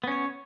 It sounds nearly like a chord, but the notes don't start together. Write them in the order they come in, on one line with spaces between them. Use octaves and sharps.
B3 C#4 C#5